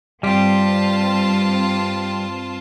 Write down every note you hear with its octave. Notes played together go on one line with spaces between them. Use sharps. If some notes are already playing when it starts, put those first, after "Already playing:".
G2 G3 C4 F4 G4 A5